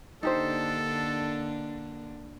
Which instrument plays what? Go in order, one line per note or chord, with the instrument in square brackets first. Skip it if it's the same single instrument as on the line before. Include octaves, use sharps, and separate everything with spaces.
[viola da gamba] D3 A#3 D4 [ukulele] D#4 G4 C5 [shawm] A4